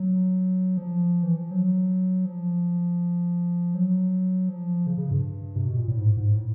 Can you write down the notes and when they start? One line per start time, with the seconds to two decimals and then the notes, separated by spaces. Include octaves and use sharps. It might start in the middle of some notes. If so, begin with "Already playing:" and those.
Already playing: F#3
0.77 F3
1.23 E3
1.37 F3
1.51 F#3
2.25 F3
3.74 F#3
4.49 F3
4.87 C#3
4.98 C#3
5.11 G2
5.56 C3
5.66 B2
5.76 A#2
5.88 A2
5.98 G#2
6.17 G#2
6.35 A2